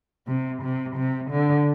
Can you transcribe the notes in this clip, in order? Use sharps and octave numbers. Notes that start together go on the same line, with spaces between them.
C3
C3
C3
D3